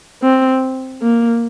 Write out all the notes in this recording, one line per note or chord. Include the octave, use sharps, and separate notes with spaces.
C4
A#3